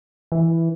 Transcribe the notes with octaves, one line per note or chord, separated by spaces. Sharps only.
E3